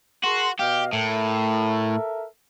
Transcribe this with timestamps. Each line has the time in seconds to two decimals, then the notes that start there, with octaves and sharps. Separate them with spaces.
0.24 F#4 G#4 A#4 C6
0.60 B2 G4 D#5 F5
0.93 A2 A4 A#4 E5